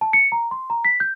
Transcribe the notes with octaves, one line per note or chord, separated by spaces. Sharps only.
A5
C#7
A#5
C6
A#5
B6
G6